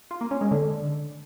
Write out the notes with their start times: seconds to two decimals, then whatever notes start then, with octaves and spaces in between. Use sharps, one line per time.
0.11 F4
0.21 A#3
0.31 C#4
0.41 G#3
0.51 D3